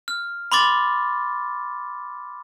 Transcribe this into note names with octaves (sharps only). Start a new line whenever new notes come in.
F6
B5 C6 D6 A6